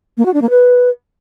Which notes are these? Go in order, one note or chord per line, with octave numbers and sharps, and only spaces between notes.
A#3
F#4
D4
A#3
B4